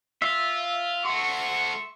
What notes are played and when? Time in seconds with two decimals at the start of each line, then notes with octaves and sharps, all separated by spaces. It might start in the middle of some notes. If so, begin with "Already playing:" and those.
0.22 F4 E5
1.05 A3 F#4 C6 C#6